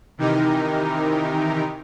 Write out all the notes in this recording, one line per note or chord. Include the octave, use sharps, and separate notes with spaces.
C3 D#3 E3 D#4 G4 A#4